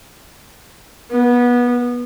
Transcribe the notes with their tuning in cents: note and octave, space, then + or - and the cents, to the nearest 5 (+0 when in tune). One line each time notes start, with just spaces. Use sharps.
B3 -20